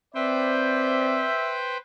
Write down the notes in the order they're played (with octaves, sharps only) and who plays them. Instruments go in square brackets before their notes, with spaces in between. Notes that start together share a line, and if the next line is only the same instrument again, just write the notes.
[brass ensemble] C4 D5 [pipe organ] B4 C5 G5 [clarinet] E5